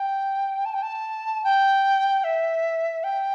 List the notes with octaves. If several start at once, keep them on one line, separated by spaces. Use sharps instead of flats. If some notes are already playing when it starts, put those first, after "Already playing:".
Already playing: G5
A5
G5
A5
G5
E5
G5